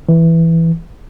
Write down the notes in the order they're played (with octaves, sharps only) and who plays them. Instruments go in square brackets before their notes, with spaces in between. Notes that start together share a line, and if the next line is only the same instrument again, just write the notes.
[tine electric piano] E3